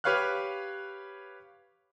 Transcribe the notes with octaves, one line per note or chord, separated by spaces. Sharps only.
G4 B4 C#5 F5 F6 F#6